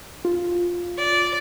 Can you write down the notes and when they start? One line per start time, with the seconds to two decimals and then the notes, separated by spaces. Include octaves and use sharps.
0.25 F4
0.98 D5